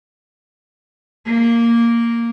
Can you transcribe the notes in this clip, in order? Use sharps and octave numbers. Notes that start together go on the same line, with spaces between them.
A#3